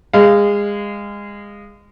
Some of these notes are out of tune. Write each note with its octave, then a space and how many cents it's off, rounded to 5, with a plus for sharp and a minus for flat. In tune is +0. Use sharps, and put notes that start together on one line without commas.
G#3 -25 F5 -20